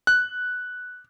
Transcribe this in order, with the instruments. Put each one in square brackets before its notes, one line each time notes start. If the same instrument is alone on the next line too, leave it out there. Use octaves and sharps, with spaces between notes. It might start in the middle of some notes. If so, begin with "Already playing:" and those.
[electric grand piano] F#6